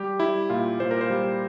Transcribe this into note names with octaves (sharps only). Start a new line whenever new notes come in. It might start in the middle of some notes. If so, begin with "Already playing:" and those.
Already playing: G3 G4
G3 E4
A#2 F4
A#2 C5
A#4
C5
G3